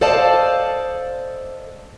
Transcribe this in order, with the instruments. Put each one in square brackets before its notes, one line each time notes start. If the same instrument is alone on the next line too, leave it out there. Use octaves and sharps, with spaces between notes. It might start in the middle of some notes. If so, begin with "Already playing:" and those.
[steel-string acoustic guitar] A4 C5 D5 D#5 F5 A5